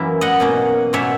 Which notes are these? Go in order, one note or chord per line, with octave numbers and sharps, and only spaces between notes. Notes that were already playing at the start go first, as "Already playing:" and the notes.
Already playing: F#2 E3 A#3 C#4 E5
D#5 F#5
B2 A#3 C#4
B2 A#3 C#4 C#5 E5